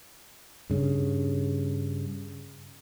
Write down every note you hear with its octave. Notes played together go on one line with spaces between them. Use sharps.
G2 C#3